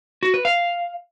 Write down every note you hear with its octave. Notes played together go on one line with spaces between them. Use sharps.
F#4
B4
F5